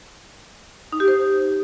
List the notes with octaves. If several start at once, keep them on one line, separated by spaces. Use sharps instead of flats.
D#4
G4
C5